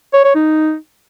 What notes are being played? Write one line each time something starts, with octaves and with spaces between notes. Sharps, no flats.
C#5
C#5
D#4